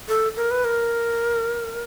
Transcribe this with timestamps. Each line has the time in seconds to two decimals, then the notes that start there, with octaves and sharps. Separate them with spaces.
0.08 A4
0.37 A#4
0.51 B4
0.64 A#4